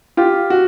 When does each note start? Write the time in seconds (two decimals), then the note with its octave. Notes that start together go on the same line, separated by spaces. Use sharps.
0.17 F4 G4
0.50 F#4